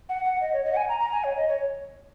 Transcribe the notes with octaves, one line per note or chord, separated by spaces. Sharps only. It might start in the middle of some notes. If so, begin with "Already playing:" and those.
F#5
F#5
D#5
C#5
D#5
F#5
G#5
A#5
A#5
G#5
C#5
D#5
C#5